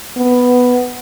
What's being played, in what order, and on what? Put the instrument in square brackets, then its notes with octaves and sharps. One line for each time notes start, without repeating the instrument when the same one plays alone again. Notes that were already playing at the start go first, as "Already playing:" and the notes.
[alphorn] B3